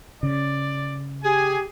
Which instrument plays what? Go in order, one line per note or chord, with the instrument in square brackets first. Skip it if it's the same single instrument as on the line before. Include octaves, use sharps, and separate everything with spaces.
[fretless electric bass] C#3 [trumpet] D5
[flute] G4 [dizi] G#4 [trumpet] G#5